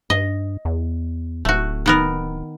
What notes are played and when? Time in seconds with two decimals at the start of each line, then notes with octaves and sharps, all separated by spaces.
0.10 G2 D#5
0.65 E2
1.45 D1 A3 F#4
1.86 D#3 B3 A#4